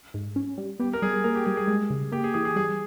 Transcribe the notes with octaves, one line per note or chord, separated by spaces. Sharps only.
G#2
C#4
G3
B3 G4
A#4
G3 G#4
A#3 A#4
G4
G3 G#4
G#4
G#3
C#3
A#3 G4
G#4
E3 G#4
G#4
G3 G#4